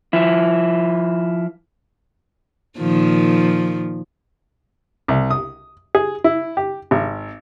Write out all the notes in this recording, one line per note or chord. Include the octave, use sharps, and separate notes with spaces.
F3 E4
A#2 D#3 F3
C2
D#6
G#4
E4
G4
G#1